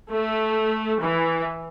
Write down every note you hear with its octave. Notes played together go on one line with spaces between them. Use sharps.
A3
E3